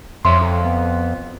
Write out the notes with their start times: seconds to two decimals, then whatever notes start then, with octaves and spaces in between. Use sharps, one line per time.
0.25 F2 C#5 E5 C6
0.42 A4
0.64 B3